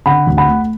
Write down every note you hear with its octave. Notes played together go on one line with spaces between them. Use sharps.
D3 F#5 B5
D2
F#5 B5
A3